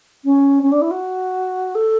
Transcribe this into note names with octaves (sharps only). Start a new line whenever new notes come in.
C#4
C#4
D4
E4
F#4
A4